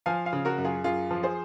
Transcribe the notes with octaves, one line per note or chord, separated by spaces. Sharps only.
F3 F5 G#5
F5 G#5
C#3
F#4 A#4
F#2
F4 G#4
F#2 F4 G#4
F3
G#4 C5